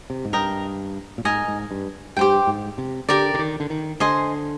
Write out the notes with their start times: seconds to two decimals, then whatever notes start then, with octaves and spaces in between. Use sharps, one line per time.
0.10 C3
0.25 G#2
0.33 G2 A#4 D#5 G5
1.18 A#2
1.25 G#2 A#4 D#5 G#5
1.48 G#2
1.71 G2
2.17 G2 G4 C5 G5
2.47 G#2
2.78 C3
3.09 D3 G4 A#4 D5
3.34 D3
3.39 D#3
3.60 D3
3.70 D#3
4.00 D3 C5 D#5 G#5 C6